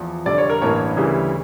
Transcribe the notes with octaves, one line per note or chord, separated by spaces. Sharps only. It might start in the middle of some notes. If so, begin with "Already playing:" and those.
Already playing: E2 F3
F1 F2 D3 G3 D5
C#5
A#4
A1 G2 E3 A#3 C#5
D2 C#3 E3 G3